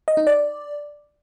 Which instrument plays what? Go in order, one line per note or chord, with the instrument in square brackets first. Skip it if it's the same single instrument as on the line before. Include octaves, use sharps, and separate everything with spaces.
[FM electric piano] D#5
D#4
D5